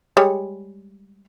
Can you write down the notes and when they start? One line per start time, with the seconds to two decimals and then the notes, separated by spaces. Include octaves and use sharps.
0.17 G3 G#3 C#5